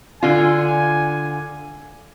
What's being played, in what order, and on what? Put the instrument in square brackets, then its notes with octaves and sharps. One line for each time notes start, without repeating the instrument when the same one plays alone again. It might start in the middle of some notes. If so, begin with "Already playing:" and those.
[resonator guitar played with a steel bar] D3 F4 [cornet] G#5